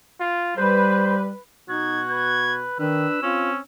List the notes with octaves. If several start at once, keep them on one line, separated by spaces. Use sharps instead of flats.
F4
G3 B4 C5
B2 D#4 F#4 G#6
B4 G#6
D#3 D4 B4 E6
C4 C#4 F4